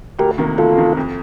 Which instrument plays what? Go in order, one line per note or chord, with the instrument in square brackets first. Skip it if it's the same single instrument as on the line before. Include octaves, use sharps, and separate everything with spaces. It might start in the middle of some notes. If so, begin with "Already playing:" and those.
[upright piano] D2 [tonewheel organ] G4 A#4
[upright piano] C3 D#3 A#3
[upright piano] D2 [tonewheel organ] F4 A4
[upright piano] C3 D#3 A#3
F2